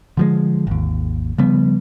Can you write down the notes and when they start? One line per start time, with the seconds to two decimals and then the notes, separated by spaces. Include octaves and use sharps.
0.17 D3 F3 G#3
0.67 G#1 D#2
1.38 C#3 F3 G3 B3